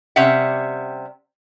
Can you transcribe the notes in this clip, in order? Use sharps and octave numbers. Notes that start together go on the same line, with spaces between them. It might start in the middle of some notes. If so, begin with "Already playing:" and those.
C3 G3 C#4 E5 F#5